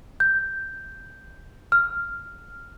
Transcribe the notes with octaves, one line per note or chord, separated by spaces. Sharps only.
G6
F6